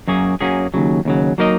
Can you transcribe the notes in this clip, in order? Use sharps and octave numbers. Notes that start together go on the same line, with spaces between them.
F#2 F#3 A#3 C#4 G#4
F#2 F#3 A#3 C#4 G#4
D#2 C#3 F#3
D#2 C#3 F#3
F#3 A#3 D#4 A#4 D#5